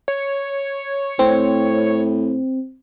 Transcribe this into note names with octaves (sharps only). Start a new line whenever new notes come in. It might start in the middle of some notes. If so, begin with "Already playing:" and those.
C#5
A2 C4